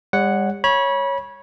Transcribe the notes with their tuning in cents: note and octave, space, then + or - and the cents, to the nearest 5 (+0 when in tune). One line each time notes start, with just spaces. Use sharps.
G3 +40 C#5 +0 F#5 +0
C#5 -5 B5 -30